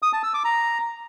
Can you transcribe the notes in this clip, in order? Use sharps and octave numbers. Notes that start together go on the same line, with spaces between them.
D#6
A5
E6
D6
A#5